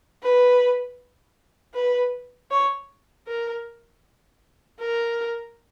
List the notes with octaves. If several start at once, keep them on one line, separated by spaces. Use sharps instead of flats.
B4
B4
C#5
A#4
A#4